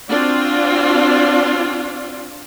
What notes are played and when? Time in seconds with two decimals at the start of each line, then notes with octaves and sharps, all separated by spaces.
0.10 C4 D4 F4 F#4 D5